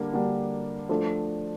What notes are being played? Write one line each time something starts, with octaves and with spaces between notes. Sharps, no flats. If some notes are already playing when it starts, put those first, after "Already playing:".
Already playing: D3 G3 A#3 D4
D3 G3 A#3 D4
F3 A3 D4 A4 D5